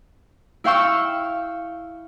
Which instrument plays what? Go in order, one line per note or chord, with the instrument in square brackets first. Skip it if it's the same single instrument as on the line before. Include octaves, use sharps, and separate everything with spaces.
[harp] E4 F5 G5 C#6 E6